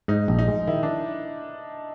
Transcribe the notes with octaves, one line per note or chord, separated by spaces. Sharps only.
G#2 D#4
A#1
D#4
G#3
D#3 E4
D4